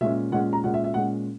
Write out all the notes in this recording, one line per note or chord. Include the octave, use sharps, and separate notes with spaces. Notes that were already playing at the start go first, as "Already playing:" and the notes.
A#2 G#3 C#4 E5
A#2 G#3 C#4 F#5
A#5
A#2 G#3 C#4 F#5
E5
E5
A#2 G#3 C#4 F#5